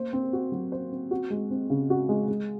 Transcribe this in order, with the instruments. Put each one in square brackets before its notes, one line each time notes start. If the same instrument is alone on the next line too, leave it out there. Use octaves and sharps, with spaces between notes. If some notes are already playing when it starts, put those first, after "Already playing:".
Already playing: [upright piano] A#3 C5
C4
F#4
F#3
C5
C4
F#4
G#3
C4
C#3
F#4
G#3
G#3